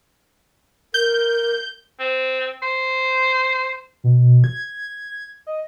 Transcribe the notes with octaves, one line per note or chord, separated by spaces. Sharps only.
A#4 G6
C4
C5
B2
G#6
D#5